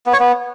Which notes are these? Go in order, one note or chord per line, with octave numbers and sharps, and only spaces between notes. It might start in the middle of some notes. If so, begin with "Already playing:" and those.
B3
C#5
B3